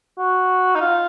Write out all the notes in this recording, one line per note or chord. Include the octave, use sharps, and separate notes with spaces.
F#4
D#4
F4